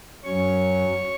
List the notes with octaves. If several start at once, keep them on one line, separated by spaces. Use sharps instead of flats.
F#2 F#3 C#4 C#5 C#6